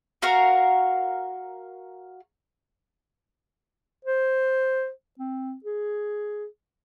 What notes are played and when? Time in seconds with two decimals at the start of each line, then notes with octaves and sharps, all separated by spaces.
0.22 F#4 A#4 F5
4.05 C5
5.19 C4
5.64 G#4